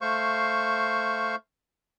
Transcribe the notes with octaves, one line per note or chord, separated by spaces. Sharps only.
A3 C5 F5 C#6